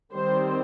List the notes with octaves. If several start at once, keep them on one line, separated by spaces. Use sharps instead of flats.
D#3 G3 C4 C5